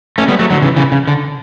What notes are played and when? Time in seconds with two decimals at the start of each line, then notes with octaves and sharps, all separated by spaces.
0.18 A3 C#4
0.28 G3 B3
0.39 F#3 A3
0.50 D3 F#3
0.62 C#3 E3
0.76 C#3 E3
0.92 C#3
1.07 D3